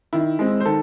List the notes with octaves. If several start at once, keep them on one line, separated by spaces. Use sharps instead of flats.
D#3 E4
G#3 C4
C5
D#3 A4